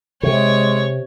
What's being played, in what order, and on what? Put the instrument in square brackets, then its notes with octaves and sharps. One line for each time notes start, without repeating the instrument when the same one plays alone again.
[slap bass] C3 [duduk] G#3 [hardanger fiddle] C#5